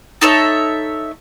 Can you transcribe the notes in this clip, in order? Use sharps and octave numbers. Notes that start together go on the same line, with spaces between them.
D#4 A4 C#5 E5